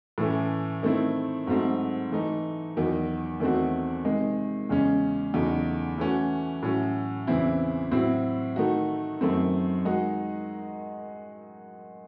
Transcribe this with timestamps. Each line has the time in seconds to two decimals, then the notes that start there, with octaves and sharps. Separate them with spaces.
0.18 A2 E3 A3 C#4
0.83 D#3 A3 C4 E4
1.47 G#2 F#3 A3 C4
2.12 E3 A3 D#4
2.76 E2 D#3 F#3
3.40 E2 D#3 A3 C4 F#4
4.05 C3 D#3 G#3
4.69 E2 C#3 G#3 C#4
5.34 E2 C#3 F#3 A3 D#4
5.98 E3 A3 C#4 F#4
6.63 A2 F#3 C#4
7.27 E2 C#3 E3 C4 E4
7.92 A2 F#3 C4 E4
8.56 D#3 A3 D#4 F#4
9.21 F#2 D#3 A3 C4
9.85 D#3 G#3 D#4 F#4